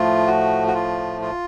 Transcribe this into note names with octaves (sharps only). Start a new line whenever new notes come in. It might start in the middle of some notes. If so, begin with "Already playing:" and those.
Already playing: A2 F3 A3 F4
F#4
F#4
F4
F4